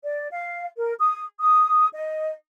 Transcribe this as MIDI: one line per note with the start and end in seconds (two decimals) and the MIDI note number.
0.03 0.27 74
0.30 0.65 77
0.76 0.94 70
0.99 1.23 87
1.40 1.88 87
1.94 2.31 75